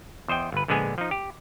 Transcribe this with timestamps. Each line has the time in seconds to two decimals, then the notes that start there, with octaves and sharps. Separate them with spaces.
0.28 E2 C5 D#5 G5
0.52 G1 B4
0.68 A#1 D3 G#3 B3 G#4 G#5
0.98 F3 D#4
1.11 G4